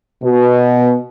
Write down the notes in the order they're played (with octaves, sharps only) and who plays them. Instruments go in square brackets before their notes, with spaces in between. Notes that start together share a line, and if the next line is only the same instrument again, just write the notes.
[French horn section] B2